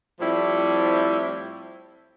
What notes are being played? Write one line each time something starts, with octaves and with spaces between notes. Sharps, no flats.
A2 F3 G3 C4 E4